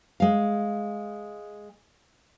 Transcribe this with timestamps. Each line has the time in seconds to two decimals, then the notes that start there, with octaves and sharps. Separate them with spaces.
0.20 G#3 F5